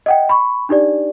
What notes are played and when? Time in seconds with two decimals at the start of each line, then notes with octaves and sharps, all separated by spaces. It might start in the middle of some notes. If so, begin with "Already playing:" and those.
0.06 D#5 F#5 G5
0.29 B5 C#6
0.69 D4 D#4 G4 D5